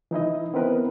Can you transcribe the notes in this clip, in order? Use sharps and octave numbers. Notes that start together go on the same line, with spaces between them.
E3 D#4 E4 D#5
B3 C4 E4 A#4 B4